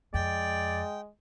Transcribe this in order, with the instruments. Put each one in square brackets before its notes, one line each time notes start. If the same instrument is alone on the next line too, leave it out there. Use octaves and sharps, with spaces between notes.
[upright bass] F2 [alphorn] G#3 [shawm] D5 [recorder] G5